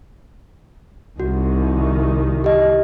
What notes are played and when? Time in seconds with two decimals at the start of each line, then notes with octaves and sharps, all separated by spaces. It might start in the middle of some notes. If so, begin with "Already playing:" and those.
1.20 C2 D#3 F#4
2.44 G4 D#5